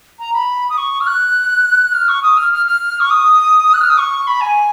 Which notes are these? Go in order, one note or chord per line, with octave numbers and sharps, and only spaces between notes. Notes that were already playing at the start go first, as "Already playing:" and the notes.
A#5
B5
D#6
C#6
F6
F#6
F6
C#6
D#6
F6
F6
F6
C#6
D#6
F#6
F6
D#6
C#6
B5
G#5